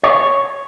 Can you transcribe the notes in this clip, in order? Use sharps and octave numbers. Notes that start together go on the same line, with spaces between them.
C#5